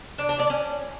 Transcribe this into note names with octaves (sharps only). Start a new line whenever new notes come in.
D4
D4
D5
C#4